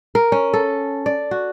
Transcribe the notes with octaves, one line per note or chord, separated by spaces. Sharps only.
A#4
C#4
A4
D5
F#4